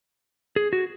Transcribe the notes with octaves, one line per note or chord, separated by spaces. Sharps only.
G#4
F#4